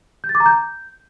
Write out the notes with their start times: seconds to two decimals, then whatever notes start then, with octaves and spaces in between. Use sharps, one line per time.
0.24 G6
0.29 A6
0.35 D6
0.40 A#5
0.46 G6